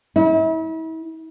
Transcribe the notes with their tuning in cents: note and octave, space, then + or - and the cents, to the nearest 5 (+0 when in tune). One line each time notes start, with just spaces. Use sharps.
E4 -40